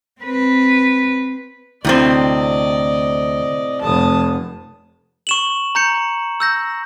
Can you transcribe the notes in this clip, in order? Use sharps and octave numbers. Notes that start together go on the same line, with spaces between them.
C4 B4
D2 A2 C3 C4 D5 D#5
F1 A5 D#6
C#6 E7 F#7
A#5 G6 C#7
E6 G6 A#6